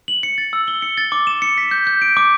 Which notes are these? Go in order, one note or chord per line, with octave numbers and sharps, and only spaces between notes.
F#7
C#7
A6
E6
G7
C#7
A6
D6
E7
C#7
B6
G6
G6
D7
D6